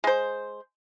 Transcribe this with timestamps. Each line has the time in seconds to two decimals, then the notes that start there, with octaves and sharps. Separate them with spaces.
0.04 G#3 C5